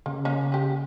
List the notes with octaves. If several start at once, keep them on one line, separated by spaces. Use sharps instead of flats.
C#3 A#3
A#3 C#4
G4 G#4